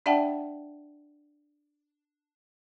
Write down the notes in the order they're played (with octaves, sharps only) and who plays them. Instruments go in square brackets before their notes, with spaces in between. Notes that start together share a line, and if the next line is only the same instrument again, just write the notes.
[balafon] D4 D5 E5 F#5 G5 A5